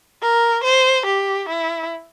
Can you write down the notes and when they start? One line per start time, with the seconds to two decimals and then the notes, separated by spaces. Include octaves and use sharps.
0.22 A#4
0.64 C5
1.06 G4
1.49 E4